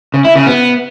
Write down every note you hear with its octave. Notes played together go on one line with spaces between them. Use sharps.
C#3
E4
C#3
B3